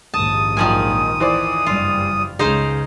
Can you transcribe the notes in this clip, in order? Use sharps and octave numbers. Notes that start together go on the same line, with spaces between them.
A#1 D#2 G#2 A5 D#6
F#2 A#2 D#3 F3 G#5
E3 C5 D5
F#1 G2 G3 F4
C#2 C#3 D#4 C5 F5